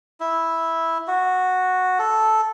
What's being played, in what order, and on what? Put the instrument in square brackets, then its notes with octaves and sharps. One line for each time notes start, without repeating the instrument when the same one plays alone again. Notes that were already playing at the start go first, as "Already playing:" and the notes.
[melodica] E4
F#4
A4